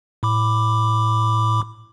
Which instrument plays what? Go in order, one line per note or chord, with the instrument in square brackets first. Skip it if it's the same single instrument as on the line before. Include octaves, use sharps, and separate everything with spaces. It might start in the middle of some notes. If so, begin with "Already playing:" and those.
[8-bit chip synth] A2 B5 D6